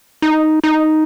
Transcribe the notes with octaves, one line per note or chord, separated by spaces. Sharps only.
D#4
D#4